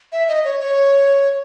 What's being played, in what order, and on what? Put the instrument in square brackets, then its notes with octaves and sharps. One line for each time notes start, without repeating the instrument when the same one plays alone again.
[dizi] E5
D#5
C#5
C#5